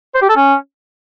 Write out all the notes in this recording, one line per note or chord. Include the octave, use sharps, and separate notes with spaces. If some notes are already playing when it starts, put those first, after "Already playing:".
C5
G4
A4
C#4